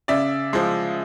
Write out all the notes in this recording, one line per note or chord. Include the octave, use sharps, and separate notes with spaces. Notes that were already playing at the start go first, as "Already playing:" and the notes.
C#3 D5 E5
F3 G#3